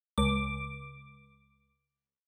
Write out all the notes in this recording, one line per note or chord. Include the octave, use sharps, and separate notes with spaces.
C#2 D6